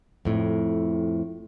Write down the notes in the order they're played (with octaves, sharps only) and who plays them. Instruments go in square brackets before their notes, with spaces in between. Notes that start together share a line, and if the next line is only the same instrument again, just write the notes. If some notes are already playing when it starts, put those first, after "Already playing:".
[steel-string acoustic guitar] F2 A2